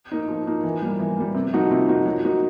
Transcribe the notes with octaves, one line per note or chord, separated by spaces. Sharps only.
A#3 D#4
F3
A#3 D#4
E3
G3 A#3
E3
G3 A#3
C3
F3 A#3 D#4 F#4
C3
F3 A#3 D#4 F#4
F#3
A#3 D#4 F#4